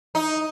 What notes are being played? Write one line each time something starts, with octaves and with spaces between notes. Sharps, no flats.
D#4